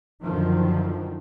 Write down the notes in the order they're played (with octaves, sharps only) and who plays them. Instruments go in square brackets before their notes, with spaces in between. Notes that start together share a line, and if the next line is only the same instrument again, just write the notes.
[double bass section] F#2 D3 D#3 F3